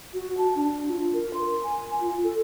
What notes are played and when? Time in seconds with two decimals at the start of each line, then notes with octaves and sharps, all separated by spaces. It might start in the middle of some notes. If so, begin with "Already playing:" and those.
0.14 F#4
0.38 A5
0.56 D4
0.88 F4
1.13 A#4
1.34 C6
1.63 G#5
2.00 F4
2.23 A4